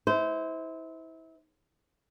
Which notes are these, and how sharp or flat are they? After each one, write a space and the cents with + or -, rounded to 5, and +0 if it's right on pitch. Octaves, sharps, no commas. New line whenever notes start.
E4 -30 C5 -25